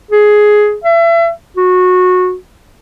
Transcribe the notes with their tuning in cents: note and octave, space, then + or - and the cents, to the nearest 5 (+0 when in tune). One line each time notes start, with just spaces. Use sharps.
G#4 +10
E5 +35
F#4 -20